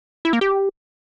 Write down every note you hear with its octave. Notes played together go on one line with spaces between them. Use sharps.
E4
A#3
G4